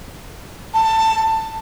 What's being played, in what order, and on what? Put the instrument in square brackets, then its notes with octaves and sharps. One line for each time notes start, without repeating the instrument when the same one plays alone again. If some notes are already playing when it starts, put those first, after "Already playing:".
[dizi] A5